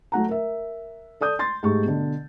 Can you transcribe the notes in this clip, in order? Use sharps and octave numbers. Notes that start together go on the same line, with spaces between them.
F#3 A3 F#5 A#5
A#4 E5
A4 D5 D#6 G6
C6 A6
G#2 A3 G4 C#6
B2 D3